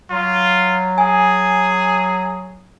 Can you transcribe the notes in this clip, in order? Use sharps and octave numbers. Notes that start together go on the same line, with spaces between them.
F#3 F4
G#4 G#5